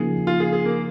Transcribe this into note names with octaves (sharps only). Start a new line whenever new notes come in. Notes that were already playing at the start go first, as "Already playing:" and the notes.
Already playing: C#3 F3 A#3 D#4 G#4
F4
G#4
G#4
A#3